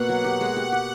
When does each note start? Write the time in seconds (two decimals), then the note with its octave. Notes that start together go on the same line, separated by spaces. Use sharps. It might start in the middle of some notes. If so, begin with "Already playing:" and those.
Already playing: B2 A#3 F#5
0.09 F#3
0.24 G4 F#5
0.41 G#3
0.56 G4
0.72 G4